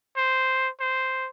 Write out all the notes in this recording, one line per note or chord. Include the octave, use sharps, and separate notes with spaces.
C5
C5